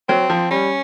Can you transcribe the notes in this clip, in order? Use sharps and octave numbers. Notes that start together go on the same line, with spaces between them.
F#3 C4
F3
G3 C#4